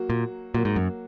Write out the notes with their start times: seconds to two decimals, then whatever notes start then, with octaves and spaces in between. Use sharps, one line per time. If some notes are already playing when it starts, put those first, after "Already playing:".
Already playing: F#3 A#3 F#4
0.10 A#2
0.54 A#2 F#3 A#3 F#4
0.65 G#2
0.76 F#2